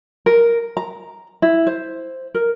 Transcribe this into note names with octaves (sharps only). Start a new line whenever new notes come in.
A#4
A#5
E4
C5
A#4